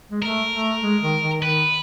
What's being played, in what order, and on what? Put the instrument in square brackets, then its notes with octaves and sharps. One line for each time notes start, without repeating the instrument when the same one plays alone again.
[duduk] G#3
[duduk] A3 [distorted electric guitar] A#4
[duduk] A3
G#3
D#3
D#3
[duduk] D#3 [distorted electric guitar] B4